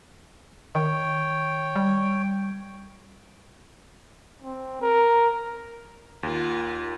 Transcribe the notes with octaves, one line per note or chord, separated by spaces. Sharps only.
D#3 C#5 G5
G3
C4
A#4
D#2 F4 A#4 F#5